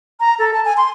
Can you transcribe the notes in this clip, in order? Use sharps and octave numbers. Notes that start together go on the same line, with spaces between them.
A#5
A4
A5
G#5
C6